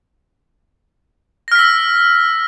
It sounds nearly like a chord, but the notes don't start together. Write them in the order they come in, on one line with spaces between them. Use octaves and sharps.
A#6 F6 B6 E6